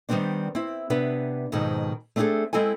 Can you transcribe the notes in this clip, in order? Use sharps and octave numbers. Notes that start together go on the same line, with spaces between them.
D#3 G3 A3 B3 C4 D4
C4 E4
C3 B3 D4 B4
F2 G#2 B2 D#3
A3 C4 D4 F#4 G#4 A4
G#3 C4 E4 A4 G#5